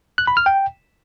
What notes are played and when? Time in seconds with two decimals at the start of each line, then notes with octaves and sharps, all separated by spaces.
0.18 F#6
0.27 B5
0.37 F6
0.46 G5